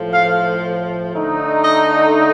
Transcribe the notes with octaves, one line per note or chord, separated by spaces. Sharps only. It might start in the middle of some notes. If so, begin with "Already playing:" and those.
Already playing: A2 F3 A3
F5
D3 A3 D#4
D#5